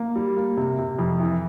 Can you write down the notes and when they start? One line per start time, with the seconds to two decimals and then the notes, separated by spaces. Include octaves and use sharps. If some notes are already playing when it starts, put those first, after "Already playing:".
Already playing: A#3
0.16 G3
0.37 A#3
0.57 C3
0.78 C3
0.99 F2
1.20 E3